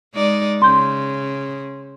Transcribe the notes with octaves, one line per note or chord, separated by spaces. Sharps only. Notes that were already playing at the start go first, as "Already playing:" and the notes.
G#3 D#4 D5
C#3 C6 G6